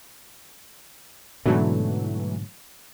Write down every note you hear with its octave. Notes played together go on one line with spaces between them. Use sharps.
G#2 B2 D3 E3 F#3 A3